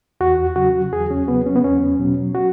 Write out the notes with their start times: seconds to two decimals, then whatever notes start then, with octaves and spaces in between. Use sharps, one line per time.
0.21 E2 F#4
0.56 C#3 F#3 F#4
0.92 E2 G#4
1.11 C#4
1.28 C#3 F#3 B3
1.46 C#4
1.56 B3
1.64 E2 C#4
1.99 B2 F#3
2.35 F#4